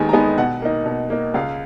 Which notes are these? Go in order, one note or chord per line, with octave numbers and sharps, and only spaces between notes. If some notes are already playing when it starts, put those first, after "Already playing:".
Already playing: D#2 D#3 G#3 B3 D#4 G#5
A#5
D#3 G#3 B3 D#4 G#5
B2 F#5
A#3 D#4
B2
A#3 D#4
C#2 F5